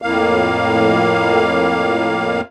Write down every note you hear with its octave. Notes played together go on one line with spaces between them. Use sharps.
F2 A2 A#3 F5